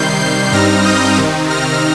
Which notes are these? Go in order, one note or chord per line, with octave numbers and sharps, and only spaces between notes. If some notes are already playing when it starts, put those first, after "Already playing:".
Already playing: C3 D#3 G3 G6 C7
G6 C7
G2 G3 C4 D#4 F6 A#6
D#6 G6
C3 D#3 C4 D#4
F6 A#6